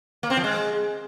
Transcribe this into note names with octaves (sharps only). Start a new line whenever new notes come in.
A#3
C4
F3
G#3